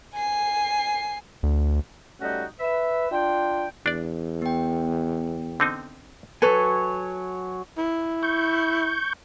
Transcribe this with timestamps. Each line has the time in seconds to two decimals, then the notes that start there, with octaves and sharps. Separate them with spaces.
0.14 G#5 C7
1.43 D2
2.20 G3 A3 C#4 D#4 F#4
2.60 B4 E5
3.11 D4 F4 G5
3.86 E2 D4 D5
4.42 B3 G5
5.60 D3 C4 D#4
6.42 F#3 A4 B4 C#5 G#5
7.78 E4
8.23 C#6 G6